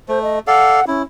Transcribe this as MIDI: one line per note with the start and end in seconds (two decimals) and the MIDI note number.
0.09 0.39 57
0.09 0.21 72
0.23 0.39 75
0.47 0.80 69
0.47 0.80 74
0.47 0.80 77
0.47 0.85 78
0.87 1.03 61
0.87 1.02 64